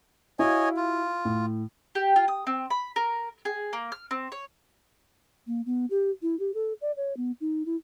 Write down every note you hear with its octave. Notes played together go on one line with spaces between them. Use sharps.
E4 F#4 C#5 D#5 F5 G#5
F4
A2
G4
F4
D#6
C4
B5
A#4
G#4
A#3
F6
C4
C#5
A#3
B3
G4
E4
G4
A4
D5
C#5
B3
D#4
E4